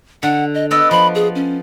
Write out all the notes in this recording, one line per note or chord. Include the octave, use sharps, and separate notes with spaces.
D3 F#5
D#5
B3 D5 D#5 E6
F3 B5
G#4
C#4